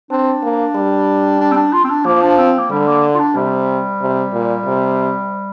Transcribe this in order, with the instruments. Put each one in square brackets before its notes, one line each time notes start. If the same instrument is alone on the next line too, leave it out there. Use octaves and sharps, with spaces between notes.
[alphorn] C4 [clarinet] D4
[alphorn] A#3
G3
[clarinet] D4
C4
D4
F4
C4
D4
[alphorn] F3 [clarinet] A#3
[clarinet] D4
C4
A#3
[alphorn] D3 [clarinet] G3
[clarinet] A#3
F4
D4
[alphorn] C3 [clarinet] G3
[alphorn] C3
A#2
C3